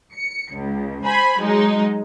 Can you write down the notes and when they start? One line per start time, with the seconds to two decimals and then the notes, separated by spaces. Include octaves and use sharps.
0.14 C#7
0.56 C#2
1.05 C5 G#5 B5
1.41 F#3 G#3 D#4